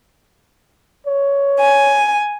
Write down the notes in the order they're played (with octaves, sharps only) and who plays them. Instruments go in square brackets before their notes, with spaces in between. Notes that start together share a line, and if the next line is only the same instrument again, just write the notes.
[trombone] C#5
[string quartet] G#5